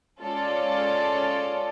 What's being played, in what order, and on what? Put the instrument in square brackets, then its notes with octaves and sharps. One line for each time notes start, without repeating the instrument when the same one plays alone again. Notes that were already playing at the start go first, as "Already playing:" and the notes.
[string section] G#3 C#4 F4 A4 D5